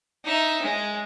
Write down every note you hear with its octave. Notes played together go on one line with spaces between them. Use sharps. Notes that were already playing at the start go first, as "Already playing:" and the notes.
D#4 E5
G#3